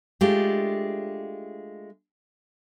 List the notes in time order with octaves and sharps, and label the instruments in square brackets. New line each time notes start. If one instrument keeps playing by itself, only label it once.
[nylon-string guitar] G#3 A3 D4 F4 G4